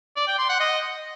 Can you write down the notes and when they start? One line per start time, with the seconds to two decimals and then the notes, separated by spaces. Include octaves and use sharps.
0.17 D5
0.28 G5
0.38 C6
0.49 F#5
0.60 D#5